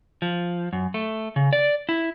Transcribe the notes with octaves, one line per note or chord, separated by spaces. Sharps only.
F3
F#2
A3
C#3
D5
E4